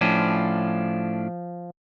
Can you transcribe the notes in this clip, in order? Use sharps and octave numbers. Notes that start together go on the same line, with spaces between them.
A2 F3 C#4 D4